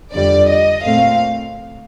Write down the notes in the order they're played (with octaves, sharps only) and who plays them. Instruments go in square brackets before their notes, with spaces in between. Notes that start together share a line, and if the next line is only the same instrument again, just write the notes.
[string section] F2 D3 G3 D5
D#5
A#2 A3 C4 F5